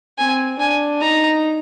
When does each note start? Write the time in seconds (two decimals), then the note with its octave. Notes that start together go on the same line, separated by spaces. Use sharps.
0.18 C4 G#5
0.60 D4 G#5
1.01 D#4 A#5